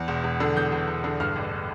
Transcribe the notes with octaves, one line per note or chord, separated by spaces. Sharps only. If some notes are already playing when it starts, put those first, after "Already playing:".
Already playing: E2
E1
E1
D3
E2 G6
E1
E1
D3
G2 F6
A1